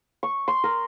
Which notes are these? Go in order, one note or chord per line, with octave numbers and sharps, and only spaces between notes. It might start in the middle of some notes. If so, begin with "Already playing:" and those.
C#6
C6
A#4